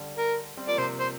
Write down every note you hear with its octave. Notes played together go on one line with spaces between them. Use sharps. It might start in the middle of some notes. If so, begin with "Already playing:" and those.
Already playing: D3 G3
A#4
G3 C4
F3 A#3 D5
C3 F3 C5
C5